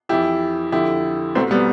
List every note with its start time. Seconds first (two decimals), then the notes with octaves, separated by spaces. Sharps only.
0.09 F2 E3 E4 G4
0.72 F2 D3 E4 G4
1.35 C2 B2 A3 C4
1.51 G3 B3